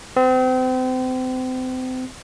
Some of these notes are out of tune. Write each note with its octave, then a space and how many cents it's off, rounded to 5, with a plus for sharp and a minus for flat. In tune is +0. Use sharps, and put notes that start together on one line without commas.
C4 -35